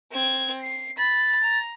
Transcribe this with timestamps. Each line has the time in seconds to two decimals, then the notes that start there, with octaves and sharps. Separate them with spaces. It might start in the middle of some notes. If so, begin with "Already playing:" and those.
0.12 C4 G#6
0.62 C7
0.99 B5 A6
1.44 A#5